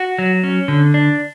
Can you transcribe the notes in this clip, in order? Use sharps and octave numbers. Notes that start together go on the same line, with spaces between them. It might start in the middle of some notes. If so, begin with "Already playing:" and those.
Already playing: F#4
F#3
C#4
D3
D4